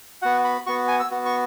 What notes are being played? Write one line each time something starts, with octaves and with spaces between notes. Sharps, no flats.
B3 F#4 F#5
B5
B3 F#4 C#6
G#5
E6
B3 F#4
C#6